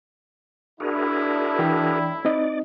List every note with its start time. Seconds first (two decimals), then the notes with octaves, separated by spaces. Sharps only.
0.80 B1 A2 D4 E4 F#4 G#4 A#4
1.59 E3 G5 B5
2.25 C4 D#4 D5 D#5